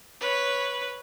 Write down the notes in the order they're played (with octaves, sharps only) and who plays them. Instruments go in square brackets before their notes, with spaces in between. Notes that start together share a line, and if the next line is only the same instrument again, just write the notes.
[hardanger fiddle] B4 C#5